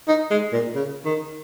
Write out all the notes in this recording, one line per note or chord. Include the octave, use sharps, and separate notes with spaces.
D#4
G#3
A#2
C#3
D#3